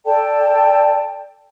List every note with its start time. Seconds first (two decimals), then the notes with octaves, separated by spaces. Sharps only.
0.05 A4 D5 G5 A5